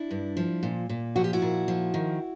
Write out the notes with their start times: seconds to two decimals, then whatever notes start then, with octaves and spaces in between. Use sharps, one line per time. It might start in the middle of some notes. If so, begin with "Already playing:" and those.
Already playing: D4 E4
0.11 G2
0.37 F3
0.63 A#2
0.89 A#2
1.16 F3 F#4
1.24 G4
1.33 E4 F#4
1.42 A#2
1.68 F3
1.94 D#3